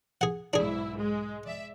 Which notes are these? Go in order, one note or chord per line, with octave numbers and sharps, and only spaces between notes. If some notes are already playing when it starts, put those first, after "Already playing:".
G#4 F#5
B1 G#2 D4 E4 G#4
G#3
D5 E5